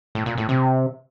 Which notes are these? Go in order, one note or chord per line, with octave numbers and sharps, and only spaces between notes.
A2
A#2
A2
C3